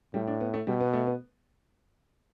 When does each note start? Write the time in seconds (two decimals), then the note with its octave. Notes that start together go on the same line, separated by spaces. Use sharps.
0.14 A2 G3
0.27 D4
0.41 B3
0.54 A3
0.67 B2 G3
0.80 B3
0.93 A3
1.07 B3